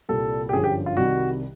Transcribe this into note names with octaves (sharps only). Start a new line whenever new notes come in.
C2 A#2 G3 A4
G4
G1 F#2 D3 F3 G#4
G4
F4
C2 C3 D#3 G3 F#4